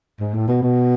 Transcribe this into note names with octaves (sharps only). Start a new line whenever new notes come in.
G#2
A2
B2
B2